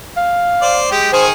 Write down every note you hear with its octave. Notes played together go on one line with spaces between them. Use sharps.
F5
C5 D5
G#3 G4
D#3 G#4 C5 G#5